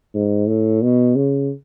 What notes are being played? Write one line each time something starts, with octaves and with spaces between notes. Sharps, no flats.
G#2
A2
B2
C#3